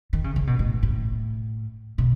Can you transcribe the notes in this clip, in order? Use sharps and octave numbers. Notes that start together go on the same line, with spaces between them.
D#3
C#3
C#3
B2
A2
A2
B2